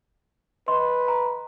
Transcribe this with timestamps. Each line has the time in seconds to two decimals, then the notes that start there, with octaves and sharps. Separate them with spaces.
0.68 B4 D#5 C6
1.08 A#5